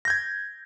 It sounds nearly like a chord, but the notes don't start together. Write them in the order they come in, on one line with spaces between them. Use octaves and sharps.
A#6 G6 G#6